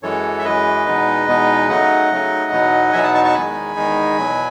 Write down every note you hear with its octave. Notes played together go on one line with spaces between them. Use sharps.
F#2 E3 G#3 A4 C#5
E5
F#2 E3 G#3 B4 D#5
E2 B2 G#3 B3 D#4
E2 B2 G#3 B3 D#4
C#3 F#3 A3 D#4 D#5 F#5
C#3 F#3 A3 D#4
E2 B2 F#3 B3 D#4
E2 B2 F#3 B3 D#4 E5 G#5
F#5 A5
A5 C#6
A5 C#6
E2 D#3 G#3 D#4 G#5 B5
E2 D#3 G#3 D#4
E2 B2 F#3